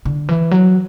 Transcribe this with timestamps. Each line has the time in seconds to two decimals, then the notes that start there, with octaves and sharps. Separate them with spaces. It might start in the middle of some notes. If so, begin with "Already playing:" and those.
0.05 D3
0.29 E3
0.51 F#3